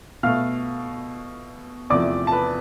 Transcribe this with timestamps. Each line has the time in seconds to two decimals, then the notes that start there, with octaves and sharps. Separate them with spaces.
0.23 B2 A3 F5 F6
1.90 E2 C3 F3 A3 D5 D6
2.27 A5
2.32 B4 B5